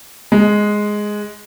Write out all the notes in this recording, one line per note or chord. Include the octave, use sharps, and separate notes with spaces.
G#3